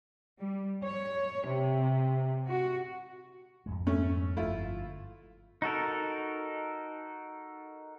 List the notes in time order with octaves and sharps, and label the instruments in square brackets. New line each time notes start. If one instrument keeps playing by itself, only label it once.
[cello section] G3
C#5
C3
F#4
[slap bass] F2 G#2 G#3
[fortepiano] A3 C#4
[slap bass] G1 F3 [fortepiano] A3 E4 F4
[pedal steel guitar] D#4 F#4 A4 A#4